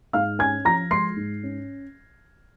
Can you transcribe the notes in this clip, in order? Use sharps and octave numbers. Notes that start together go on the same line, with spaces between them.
G#2 F5 F6
C#4 G#5 G#6
F3 A#5 A#6
G#3 C6 C7
G#2
C#4